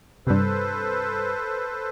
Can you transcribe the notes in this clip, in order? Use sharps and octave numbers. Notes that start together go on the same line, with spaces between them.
G2 C3 A4 B4 C5